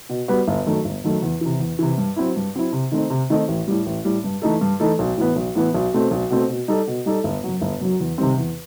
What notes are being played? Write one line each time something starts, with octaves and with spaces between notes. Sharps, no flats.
B2
G3 B3 F#4 B4
G1
F#2 D#3 A3
G1
F#2 D#3 A3
E2
C3 E3
E2
C3 E3
G2
F#3 C4 E4
G2
F#3 C4 E4
C3
D#3 A3 C4 D#4
C3
D#3 A3 C4 D#4
A1
A2 G3
A1
A2 G3
G2
E3 A3 D#4 A4
G2
E3 A3 D#4 A4
B1
A2 E3 B3
B1
A2 E3 B3
B1
B2 A3 C4
B1
B2 A3 C4
B2
G3 D#4 A4
B2
G3 D#4 A4
G1
F#2 F#3
G1
F#2 F#3
E2
C3 D#3 G3 C4
E2